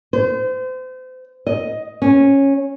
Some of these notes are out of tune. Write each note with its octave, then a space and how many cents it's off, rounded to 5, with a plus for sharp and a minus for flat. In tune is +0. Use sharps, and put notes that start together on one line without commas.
C5 -35
D#5 +10
C#4 -10